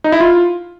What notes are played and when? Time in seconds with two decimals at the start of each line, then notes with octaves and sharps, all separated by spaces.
0.04 D#4
0.12 E4
0.20 F4